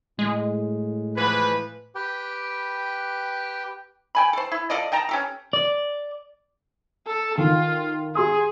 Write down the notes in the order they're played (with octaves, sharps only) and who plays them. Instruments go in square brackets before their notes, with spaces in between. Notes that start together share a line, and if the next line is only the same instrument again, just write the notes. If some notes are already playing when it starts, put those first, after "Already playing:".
[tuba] A2 [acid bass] G#3
[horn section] E3 F3 B4
[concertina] G4 B4 G5
[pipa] G5 G#5 B5
A4 C5
E4
F4 A4 D5 D#5
D#5 G5 A5 A#5
C#4 G4 A4
[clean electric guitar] D5
[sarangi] A4
[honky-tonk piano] D#3 [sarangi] F4
[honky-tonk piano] G4 C6 D#6 [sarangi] G#4